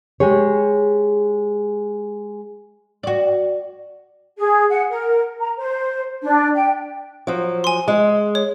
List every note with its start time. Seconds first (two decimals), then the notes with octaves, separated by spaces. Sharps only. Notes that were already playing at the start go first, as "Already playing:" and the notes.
0.20 G#3 G4 G#4 C#5
3.03 F#4 D5
4.38 G#4
4.69 F#5
4.90 A#4
5.38 A#5
5.57 C5
6.22 D4
6.54 G5
7.27 F3 F#3
7.64 G#5 C6
7.88 G#3
8.35 C#5